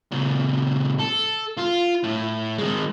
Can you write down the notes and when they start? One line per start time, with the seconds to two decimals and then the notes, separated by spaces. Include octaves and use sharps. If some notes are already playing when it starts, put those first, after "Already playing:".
0.12 A#2 C#3
0.99 A4
1.57 F4
2.04 A2
2.58 D#3 G#3